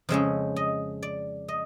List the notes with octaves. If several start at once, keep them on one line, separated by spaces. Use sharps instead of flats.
F2 C#3 F3 G#3 C#4 E5
D#5
D5
D#5